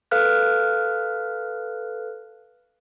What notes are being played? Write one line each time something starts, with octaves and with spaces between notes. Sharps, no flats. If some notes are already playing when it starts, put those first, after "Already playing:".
A4 B4 F5 F6 F#6